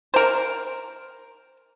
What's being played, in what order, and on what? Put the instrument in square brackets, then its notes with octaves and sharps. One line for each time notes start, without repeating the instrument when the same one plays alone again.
[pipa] A#4 C5